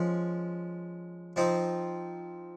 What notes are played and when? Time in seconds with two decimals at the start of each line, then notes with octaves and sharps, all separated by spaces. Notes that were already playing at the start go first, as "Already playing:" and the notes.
Already playing: F3 G#3 C#4
1.36 F3 C4 D#4